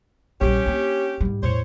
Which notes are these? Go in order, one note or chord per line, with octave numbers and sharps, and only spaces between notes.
A#1 G3 C#4 G4
A#3 D4
G#2 G3
E2 A2 C5 C#5